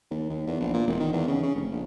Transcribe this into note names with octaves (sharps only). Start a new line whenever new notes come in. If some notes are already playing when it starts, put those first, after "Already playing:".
D#2
D#2
E2
A#1
A#2
E1
D#3
E2
C#3
C#3
F1
A#1